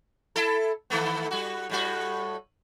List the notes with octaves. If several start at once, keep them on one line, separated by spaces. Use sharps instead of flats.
E4 A4
D#3 A3 B3
G3 F#4
A2 G3 F#4